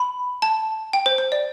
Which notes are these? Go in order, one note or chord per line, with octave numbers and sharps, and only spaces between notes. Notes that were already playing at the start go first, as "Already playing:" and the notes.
Already playing: B5
A5
G5
C5
C5
D5